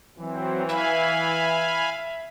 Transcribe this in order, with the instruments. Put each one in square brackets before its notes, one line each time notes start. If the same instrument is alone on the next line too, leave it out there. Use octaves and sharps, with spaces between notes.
[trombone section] E3 [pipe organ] F#3 C4
[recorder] E5 [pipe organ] F5 G#5 B5